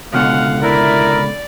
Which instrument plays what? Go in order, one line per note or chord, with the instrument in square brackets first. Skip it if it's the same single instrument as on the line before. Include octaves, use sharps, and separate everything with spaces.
[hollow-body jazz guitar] C#2 B2 D3 [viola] F5 F#5 [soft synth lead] F6
[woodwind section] E4 A#4 [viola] D5 [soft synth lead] B5